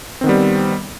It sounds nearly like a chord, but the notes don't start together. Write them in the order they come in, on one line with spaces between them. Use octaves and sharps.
C4 D#3 B3 G3